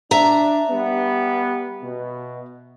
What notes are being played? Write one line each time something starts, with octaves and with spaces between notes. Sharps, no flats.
D4 E5 A#5
G3 B3
B2